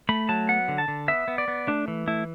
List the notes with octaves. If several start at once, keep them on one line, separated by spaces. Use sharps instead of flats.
A3 B5
F#3 A5
B3 F#5
D3
A5
D3
B3 E5
B3
D5
B3
A3 D4
E3
A3 E4